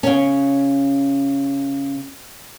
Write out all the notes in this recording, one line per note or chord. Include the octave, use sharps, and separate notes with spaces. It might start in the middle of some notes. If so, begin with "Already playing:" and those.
C#3 C#4